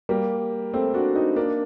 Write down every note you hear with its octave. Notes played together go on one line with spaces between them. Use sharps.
G3 A#3
A3 C4
D4 F#4
C4 D#4
A#3 D4